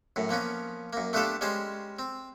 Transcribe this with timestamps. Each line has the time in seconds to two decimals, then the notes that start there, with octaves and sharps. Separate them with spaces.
0.16 F#2 A2
0.29 F3 A#3 B3 C#4
0.93 F#2 A#3
1.13 A3 B3 D4 F4 G4 A4
1.41 G3 G#3 C#4 C5
1.99 C4